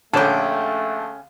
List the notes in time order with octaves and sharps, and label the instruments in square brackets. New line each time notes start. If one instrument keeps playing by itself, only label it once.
[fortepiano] A#1 D3 [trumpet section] A3 [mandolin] C#4 G5 [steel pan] C#5 A5